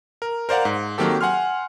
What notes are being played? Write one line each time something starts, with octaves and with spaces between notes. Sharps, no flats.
A#4
A#4 C5 D5 F5 F#5
G#2
D#3 F#3 A#3 C4 G4 A4
F#5 G#5 C6 F6